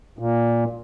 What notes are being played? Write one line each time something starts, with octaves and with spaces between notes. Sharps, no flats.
A#2